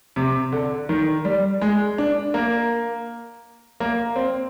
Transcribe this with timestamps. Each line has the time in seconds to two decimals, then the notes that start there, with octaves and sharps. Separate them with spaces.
0.16 C3
0.52 D3
0.89 D#3
1.25 G3
1.61 G#3
1.98 D4
2.34 A#3
3.80 A#3
4.16 C4